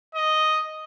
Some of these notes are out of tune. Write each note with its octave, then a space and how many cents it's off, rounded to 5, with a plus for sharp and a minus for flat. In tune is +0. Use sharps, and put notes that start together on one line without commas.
D#5 +0